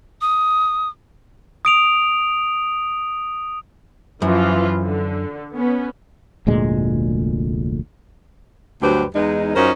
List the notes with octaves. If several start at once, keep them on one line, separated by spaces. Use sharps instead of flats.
D#6
D#6 D7 F7
F#2 E3 F3 F4
D3
B3 C#4
F1 D2 A#2 G#3
D2 G2 F#3 G4 B4 C5
E2 G#3 D#4
F#2 C#4 D#4 F4 A#4 C5